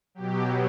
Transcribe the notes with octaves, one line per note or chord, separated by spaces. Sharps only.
B2 F#3 G4